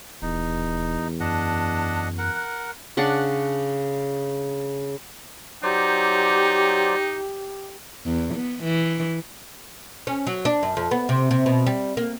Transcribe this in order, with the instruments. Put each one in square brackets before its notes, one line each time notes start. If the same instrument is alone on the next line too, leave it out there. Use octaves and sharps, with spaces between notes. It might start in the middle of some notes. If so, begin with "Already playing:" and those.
[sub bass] D#1 [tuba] E2 [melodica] D#4
[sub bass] F#2 [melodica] D4 D#5 F#5 [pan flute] A5
[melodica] A#4 F#5 [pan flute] F#6
[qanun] C#3 D4 F#5
[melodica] F#3 C5 D5 [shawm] D#4 [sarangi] G4
[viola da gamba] E2
B3
E3
[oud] C#4
F#3
D4
F#2
F2
B3
C3
C3
B2
G3
A#3